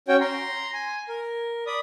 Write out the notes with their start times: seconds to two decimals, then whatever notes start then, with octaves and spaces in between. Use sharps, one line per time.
0.08 C#4 F#4 C#5 G5
0.21 A#5 C6
0.73 G#5
1.09 A#4
1.67 D5 B5 D#6